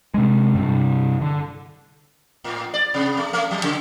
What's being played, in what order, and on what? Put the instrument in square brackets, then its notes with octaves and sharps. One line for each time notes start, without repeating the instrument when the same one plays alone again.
[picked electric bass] C3 G#3
G2 C3 G3
D3
[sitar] A2
D5
C3
A3
A3
F#3
C#3